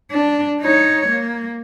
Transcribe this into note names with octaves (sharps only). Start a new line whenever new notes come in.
D4
D#4 C#5
A#3